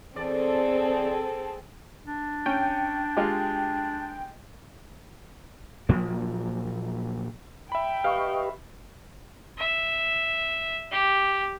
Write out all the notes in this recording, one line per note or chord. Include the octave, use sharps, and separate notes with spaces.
E2 C4 G#4 A4 D5
D4
C#4 G5
G#3 F4 G4
A#2 F3 F#3 A#3
E5 G5 B5
G4 B4 D#5 F5 C#6
E5
G4